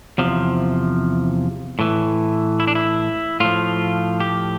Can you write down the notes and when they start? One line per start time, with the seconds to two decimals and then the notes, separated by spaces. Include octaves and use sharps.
0.18 E2 C3 F3
1.79 A2 E3
2.60 E4
2.67 D4
2.75 E4
3.40 A2 F3 F4
4.20 G4